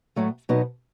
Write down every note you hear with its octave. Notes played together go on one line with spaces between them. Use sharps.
A2 F#3 A3
B2 F#3 B3 D#4